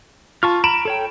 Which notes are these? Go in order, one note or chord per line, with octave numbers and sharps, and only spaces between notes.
F4 A5 C#6 F6
A#5 B5 D7 E7
A4 C#5 G5